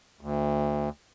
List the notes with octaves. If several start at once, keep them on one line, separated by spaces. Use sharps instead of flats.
D2